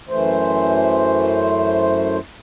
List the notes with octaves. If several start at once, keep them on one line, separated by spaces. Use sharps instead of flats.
F#2 E3 A3 C5